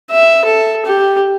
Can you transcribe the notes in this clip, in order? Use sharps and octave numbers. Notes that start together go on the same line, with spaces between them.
E5
A4
G4